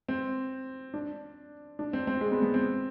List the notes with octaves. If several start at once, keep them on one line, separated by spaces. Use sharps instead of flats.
C4
D4
D4
C4
C4
G#3
B3
B3
C4